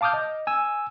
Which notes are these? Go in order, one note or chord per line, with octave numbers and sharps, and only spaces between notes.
F5 A5 D6 D#6 F6 G6
D#5
G#5 E6